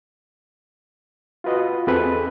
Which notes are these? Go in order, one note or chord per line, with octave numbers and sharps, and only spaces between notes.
F4 F#4 B4 D#5
E2 C4 G#4 A4 B4